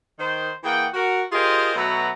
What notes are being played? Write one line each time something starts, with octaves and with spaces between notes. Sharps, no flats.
D#3 C5
E3 A#3 G#4 F#5 G5
F#4 A#4
F4 G4 G#4 A#4 C5 D#5
B2 F#3 A3 F#4 B4 A#5